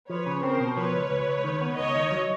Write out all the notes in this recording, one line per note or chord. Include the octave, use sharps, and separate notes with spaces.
F3 B4 C#5
C#3
C4 A#4 C5
B2
F3 B4 C#5
C#2
C#2
C#2
D#3
B3
C#2 C#5 D#5
D#3
F#3